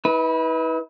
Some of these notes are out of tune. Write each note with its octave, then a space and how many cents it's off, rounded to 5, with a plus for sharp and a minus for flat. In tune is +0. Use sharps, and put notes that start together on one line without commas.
E4 -45 B4 -10